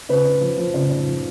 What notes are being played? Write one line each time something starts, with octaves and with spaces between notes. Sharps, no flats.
C#3 B4
C#3
F3
F3
C#3
C#3
F3